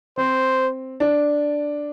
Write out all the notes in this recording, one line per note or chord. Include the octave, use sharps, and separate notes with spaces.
C4 C5
D4